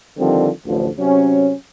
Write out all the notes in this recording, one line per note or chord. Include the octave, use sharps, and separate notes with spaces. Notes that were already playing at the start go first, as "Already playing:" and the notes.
D3 D#3 F3 G3 C4
A1 D2 D3 F3
C3 F#3 C#4